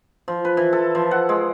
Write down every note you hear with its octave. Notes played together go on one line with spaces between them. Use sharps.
F3
B4
E3
A4
F3
F#5
G#3